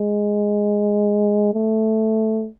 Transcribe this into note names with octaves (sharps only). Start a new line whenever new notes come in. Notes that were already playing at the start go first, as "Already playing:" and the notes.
Already playing: G#3
A3